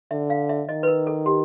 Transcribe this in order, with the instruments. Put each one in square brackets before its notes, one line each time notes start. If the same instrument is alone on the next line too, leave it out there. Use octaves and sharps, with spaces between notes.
[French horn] D3 [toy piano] E5
[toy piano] F5
E5
[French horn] D#3 [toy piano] D#5
[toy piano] B4
A#4
A4
G4